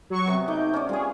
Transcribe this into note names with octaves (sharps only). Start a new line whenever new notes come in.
F#3 C#6
C3 B3 F#4
A3 D#4 D6 G6
C#4 C#5 D5
F3 G3 G#4 C#5